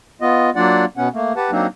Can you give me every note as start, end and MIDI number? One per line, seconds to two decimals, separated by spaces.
0.21 0.50 59
0.21 0.50 65
0.21 0.50 75
0.56 0.85 54
0.56 0.85 58
0.56 0.85 62
0.56 0.85 65
0.56 0.85 74
0.56 0.85 78
0.97 1.08 47
0.97 1.08 59
0.97 1.08 61
0.97 1.08 78
1.14 1.33 57
1.14 1.33 58
1.36 1.51 67
1.36 1.51 71
1.36 1.51 78
1.36 1.51 81
1.51 1.67 54
1.51 1.67 58
1.51 1.67 60
1.51 1.67 62
1.51 1.67 63